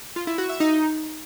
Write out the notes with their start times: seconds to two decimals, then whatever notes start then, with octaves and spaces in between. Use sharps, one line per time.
0.16 F4
0.27 E4
0.38 F#4
0.49 E5
0.60 D#4